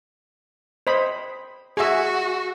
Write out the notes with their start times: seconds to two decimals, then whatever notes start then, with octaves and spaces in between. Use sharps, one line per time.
0.87 C5 D#5 B5
1.77 F#4 G#4 E5